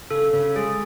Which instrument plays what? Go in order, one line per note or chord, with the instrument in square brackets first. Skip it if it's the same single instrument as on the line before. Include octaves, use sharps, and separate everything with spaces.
[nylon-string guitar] C#3 [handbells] A4
[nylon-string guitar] C#3
[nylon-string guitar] G#3 [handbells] G#4